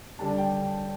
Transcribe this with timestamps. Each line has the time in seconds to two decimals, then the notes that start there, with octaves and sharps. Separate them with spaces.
0.19 D3 G3 D4 A5
0.37 G5